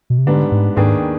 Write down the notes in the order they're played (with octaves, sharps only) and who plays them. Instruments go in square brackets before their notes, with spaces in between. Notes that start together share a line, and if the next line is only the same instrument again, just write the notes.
[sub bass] B2
C3
[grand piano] G#2 G3 B3 D4 [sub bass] D3
[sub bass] G#2
[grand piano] D#2 D#3 B3 D4 G#4 [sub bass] G#2